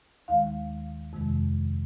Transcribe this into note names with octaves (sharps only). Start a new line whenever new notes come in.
D#2 D#3 G#3 F5
F2 C3 D#3 G#3